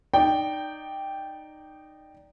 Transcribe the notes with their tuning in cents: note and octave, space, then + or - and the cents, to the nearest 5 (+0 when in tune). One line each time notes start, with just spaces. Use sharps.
D#4 -20 D5 -10 G5 +0